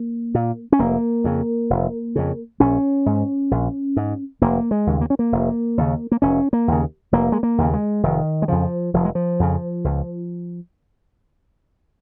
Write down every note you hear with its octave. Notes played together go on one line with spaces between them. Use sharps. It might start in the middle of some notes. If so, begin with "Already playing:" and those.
Already playing: A#3
A#2
C#4
F1 A#3
F2 C#3
F1
F2 C#3
A#1 C#4
G#2
A#1
G#2
F1 A#3
G#3
D#2 C#3
A#3
C#4
A#3
F1
D#2 C#3
A#3
F1 C#4
A#3
D#2 C#3
F1 A#3
G#3
A#3
D#2 C#3
G#3
F1 D#3
G#3
F2 C#3 F3
F1 F3
G#3
F3
F2 C#3
C#2